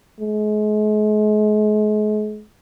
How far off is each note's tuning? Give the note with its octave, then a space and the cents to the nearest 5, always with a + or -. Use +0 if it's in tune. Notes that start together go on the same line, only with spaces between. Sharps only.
G#3 +40